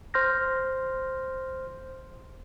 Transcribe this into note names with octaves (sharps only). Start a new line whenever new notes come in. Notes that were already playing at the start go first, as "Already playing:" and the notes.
C5 C6 F6 G6 A#6